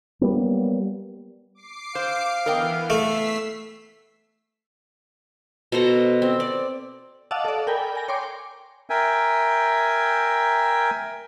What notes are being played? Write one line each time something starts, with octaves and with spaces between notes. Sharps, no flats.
F#3 G3 A#3 B3
D6 C7
C5 F5
E3 B3 A#4 D#5 G5
A3 E6 B6 C7
B2 A4 C5 A#5
C4
D5
D#5 F5 F#5 A5 D6 E6
A4 D5
A#4 G5 G#5 B5
G#5 A#6
C#5 G5 C6 D6
A#4 E5 G5 G#5